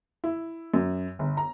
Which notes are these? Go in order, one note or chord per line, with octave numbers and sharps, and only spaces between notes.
E4
F#2
G1
A#5